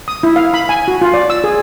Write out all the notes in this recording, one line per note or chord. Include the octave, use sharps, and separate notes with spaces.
D#6
E4
F5
B5
G#5
F#4
F4
D5
E6
G#4